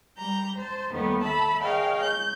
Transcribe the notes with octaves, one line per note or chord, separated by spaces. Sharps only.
G3 A#5 G6
C5 A5
D#2 D#3 G3 A3 B3
A4 E5 A5 B5
G#4 A#4 C#5 D#5 F5 G5
G6